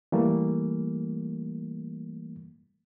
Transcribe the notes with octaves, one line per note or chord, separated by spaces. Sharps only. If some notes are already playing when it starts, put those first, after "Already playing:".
E3 G3 A3 A#3